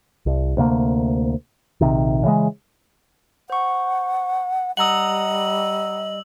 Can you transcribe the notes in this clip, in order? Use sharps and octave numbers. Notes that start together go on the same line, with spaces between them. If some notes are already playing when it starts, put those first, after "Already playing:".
C2
D2 C3 F#3 A#3
A#1 C3 D#3
C#3 E3 G3 G#3
C5 F#5 C#6
G3 D#5 F#5 A#5 D#6 E6 F#7